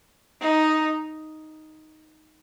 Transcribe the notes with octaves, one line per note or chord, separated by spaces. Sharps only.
D#4